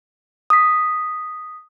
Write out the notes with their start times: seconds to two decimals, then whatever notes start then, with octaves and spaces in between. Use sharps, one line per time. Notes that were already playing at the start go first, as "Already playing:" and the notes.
0.50 D#6 B6